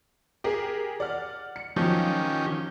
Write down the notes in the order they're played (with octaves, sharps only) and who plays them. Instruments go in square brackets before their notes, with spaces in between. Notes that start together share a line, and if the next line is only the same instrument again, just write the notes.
[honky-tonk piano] G4 G#4 A#4
D5 F#5 F6
C#7
[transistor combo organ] D#3 C#4 G4 [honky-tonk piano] F3 F#3